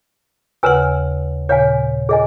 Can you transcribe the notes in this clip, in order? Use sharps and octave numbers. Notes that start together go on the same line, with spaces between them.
D#2 C#3 B4 F#5 G#5 E6
A#2 C#3 C#5 F5 G#5
G#4 D#5 G#5